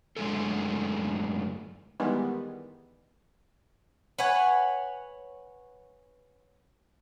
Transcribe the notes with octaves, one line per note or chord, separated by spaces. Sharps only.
F#2 D3 G#3 A3 G#4 A4
D#3 E3 G3 G#3 B3
B4 C#5 F#5 G#5